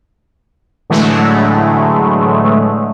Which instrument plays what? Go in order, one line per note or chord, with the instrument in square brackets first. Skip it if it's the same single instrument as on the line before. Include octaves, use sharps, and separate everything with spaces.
[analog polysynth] A2 D3 E3 F#3 G#3 A3